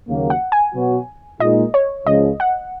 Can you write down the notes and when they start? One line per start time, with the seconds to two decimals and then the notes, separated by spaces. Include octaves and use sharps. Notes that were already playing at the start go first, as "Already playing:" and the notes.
0.09 D#2 C#3 F#3 A#3
0.30 F#5
0.52 G#5
0.75 B2 F#3 B3 F#4
1.40 A#2 G#3 D#4 D#5
1.74 C#5
2.07 C#2 C#3 F3 D#5
2.40 F#5